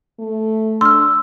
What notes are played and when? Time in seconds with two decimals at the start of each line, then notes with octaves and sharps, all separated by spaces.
0.19 A3
0.81 D4 C6 E6 F6